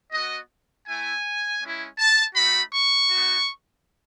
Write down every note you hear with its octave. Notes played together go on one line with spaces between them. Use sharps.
B3 F#4 D#5
A3 E4 G#5
G#3 C#4 E4
A5
A3 D#4 F#4 B5
C#6
B3 D#4 F#4